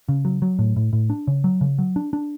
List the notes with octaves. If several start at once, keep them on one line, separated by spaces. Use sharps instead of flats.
C#3
F#3
F#3
A2
A2
A2
D4
C#3
F#3
C#3
F#3
D4
D4